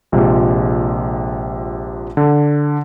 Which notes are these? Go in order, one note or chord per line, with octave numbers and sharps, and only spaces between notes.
A#1 C3 G#3 F4
D3